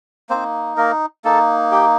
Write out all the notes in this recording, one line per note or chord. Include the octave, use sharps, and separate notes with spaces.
A#3 C4 D#4 C5
A#3 A#4
A#3 D#4 A4
G4